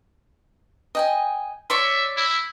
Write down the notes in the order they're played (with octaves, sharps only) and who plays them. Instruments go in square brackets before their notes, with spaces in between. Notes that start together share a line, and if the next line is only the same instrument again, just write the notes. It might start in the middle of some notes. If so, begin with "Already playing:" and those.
[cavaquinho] D#5 G5 G#5
[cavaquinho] C#5 D5 C6 [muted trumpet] E5
[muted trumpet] E4